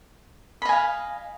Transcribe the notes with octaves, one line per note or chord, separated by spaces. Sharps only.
D#5 F5 G#5 B5